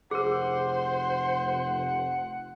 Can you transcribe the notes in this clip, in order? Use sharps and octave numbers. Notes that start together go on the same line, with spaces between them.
F1 G#4 A#4 C5 F#5